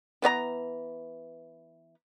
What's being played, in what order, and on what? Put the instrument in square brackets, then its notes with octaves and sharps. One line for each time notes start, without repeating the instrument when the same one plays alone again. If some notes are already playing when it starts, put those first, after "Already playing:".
[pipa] E3 B3 C#5 A#5